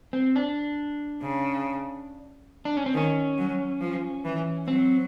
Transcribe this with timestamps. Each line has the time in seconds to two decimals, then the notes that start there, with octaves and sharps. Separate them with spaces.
0.13 C4
0.36 D4
1.22 C#3
2.65 D4
2.77 C#4
2.86 C4
2.94 D#3 C#4
3.38 F#3
3.81 F3
4.25 E3
4.68 F#3 C4